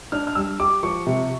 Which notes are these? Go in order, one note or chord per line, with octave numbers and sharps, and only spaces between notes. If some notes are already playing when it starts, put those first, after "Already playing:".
D4 F6
F6
G3 E6
G4 D6
F3 C#6
C3